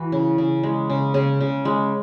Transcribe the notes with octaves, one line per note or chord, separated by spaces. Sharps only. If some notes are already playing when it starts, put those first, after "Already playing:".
Already playing: E3 E4 F#4
C#3
C#3
G#3
C#3
C#3 G#4
C#3
G#3